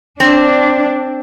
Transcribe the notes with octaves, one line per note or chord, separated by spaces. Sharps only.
C4 D4